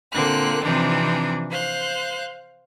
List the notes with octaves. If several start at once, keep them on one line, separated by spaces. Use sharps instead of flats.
A#2 D3 A#3 C4 F#6
C3 E3 F3 C4 D4 D#4
C5 F5 F#6